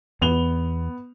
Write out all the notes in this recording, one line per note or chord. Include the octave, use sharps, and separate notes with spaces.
E2 B3 F7 G7